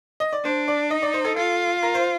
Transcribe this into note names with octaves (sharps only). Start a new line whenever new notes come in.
D#5
D5
D4 C5
D5
D#4 D#5
D5
C5
A4
F4 A4
A#4
C5